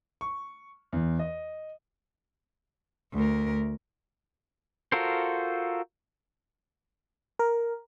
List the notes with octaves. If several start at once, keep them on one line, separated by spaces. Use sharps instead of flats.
C#6
E2
D#5
D2 A#4
F4 F#4 A4 A#4 C5
A#4